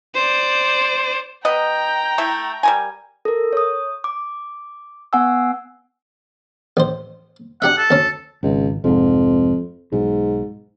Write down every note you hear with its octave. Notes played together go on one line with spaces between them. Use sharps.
C5 D5
B3 B4 D#5 G5 A#5
A3 E4 E5
G3 A#4 G#5
A4 A#4
C#5 D#6
D6
B3 F#5 G#5 E6
A1 C5
D4 G4 E5 F#5
A4
D2 C#4
G#1 C#2
F1 F2 G#2
B1 G#2